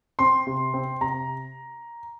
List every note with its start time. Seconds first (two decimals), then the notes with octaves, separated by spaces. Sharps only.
0.19 C4 C6
0.47 C3
0.74 C4
1.01 C3 A#5